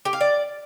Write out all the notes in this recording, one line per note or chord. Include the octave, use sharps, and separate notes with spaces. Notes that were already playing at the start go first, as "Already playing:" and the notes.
G4
F5
D5